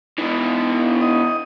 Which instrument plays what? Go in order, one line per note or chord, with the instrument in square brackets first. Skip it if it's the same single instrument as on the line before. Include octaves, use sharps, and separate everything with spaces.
[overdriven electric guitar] B2 E3 [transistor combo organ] D#4
[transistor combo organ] D#5 D#6